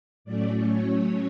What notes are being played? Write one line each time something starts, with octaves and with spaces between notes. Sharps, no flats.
A2 F#3 A3 C#4 D5
C#5